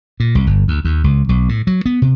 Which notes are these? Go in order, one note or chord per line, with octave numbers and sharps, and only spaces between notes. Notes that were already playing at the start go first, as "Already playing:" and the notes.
A#2
C2
G1
D2
D#2
C#2
B1
A2
F#3
B3
C3